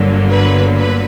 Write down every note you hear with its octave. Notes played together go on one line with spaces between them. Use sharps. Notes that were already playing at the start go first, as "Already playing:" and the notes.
Already playing: G1 G2 D3 F#3 A#3
B4
B4